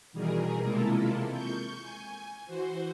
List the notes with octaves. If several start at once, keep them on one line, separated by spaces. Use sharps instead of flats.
B2 D#3 E3 G3 G#4 A#4
C3 G#3 A#3 E4 F4 A4
C#6 G6
G#5
E3 F#4 C5